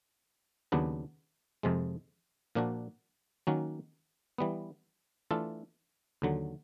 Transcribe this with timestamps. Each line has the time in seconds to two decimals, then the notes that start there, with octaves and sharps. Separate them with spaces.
0.72 D#2 C#3 F#3 B3 D4
1.63 F2 C3 F3 G#3
2.55 A#2 F3 A#3 D4 F#4
3.47 D#3 F#3 A#3 C#4 F#4
4.38 E3 G3 B3
5.31 E3 A3 D4 F4 A4
6.22 D#2 D3 F#3